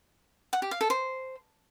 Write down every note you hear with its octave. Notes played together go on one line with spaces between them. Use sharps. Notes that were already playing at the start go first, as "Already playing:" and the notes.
F#5
G4
F5
A4
C5